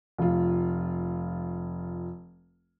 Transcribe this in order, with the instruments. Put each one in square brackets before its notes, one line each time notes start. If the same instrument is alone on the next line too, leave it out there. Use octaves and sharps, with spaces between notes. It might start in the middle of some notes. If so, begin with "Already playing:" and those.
[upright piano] F1 F4